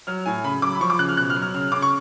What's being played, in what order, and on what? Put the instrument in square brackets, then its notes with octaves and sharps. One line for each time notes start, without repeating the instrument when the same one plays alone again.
[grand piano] F#3 F6
A2 G#5
C#3 B5
F#3 D6
B5
F3 C#6
D6
C#3 F#6
F6
B2 F#6
F6
F#3
F6
C#3 F6
C#3 D6
C#6